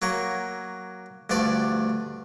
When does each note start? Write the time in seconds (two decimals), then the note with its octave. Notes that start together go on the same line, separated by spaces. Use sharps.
0.02 F#3 A#3 C#5
1.30 D2 G2 F3 D5 F5